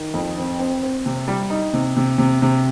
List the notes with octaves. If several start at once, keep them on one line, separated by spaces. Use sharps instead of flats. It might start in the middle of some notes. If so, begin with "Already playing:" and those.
Already playing: D#3
F2
C4
C4
C4
C3
G3
D#4
C3
C3
C3
C3